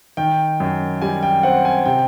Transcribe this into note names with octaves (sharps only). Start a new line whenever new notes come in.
D#3 G5
F#2
G3 G#5
G5
C4 F#5
G#5
C3 G5